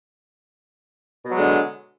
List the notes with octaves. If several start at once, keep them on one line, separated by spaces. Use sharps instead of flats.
B2 D3 F#3 G#3